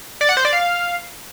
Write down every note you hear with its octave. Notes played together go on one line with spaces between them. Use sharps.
D5
F#5
C5
D5
F5